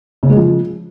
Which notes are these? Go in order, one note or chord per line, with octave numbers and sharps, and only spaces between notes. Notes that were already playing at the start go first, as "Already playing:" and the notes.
C#3
G#3
F3